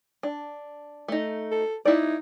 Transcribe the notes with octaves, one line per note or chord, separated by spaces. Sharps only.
D4
A3 D#4
A4
D#4 E4 D5